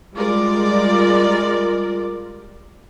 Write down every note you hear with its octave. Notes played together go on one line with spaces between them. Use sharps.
G3 G#3 F4 A#4 D5